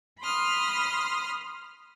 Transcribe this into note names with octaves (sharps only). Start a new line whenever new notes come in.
B5 C6 D#6 F6